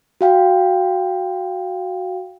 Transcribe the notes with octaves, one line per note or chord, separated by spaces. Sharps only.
F#4 F5 G5